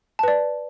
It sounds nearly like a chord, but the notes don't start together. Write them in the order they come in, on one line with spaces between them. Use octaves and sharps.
A5 B4 D5